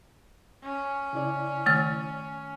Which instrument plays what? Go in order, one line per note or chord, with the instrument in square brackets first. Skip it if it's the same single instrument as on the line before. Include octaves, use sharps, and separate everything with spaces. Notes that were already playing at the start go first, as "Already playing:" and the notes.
[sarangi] C#4
[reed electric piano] C#3 E4 D5
[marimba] D#3 A3 F6